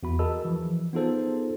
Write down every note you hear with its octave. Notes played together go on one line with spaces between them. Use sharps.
E2 F#4 B5
F#4 G#4 A#4 D#5 A5 E6
E3 F3
B3 D#4 F4 G#4 A4 C5